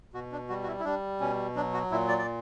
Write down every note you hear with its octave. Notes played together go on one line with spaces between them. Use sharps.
B2 F#4
D4
G3 F#4
F#4
E4
E4
G3 D4
B2 C#4
F#3 D4
F#4
A#2 E4
D5
D5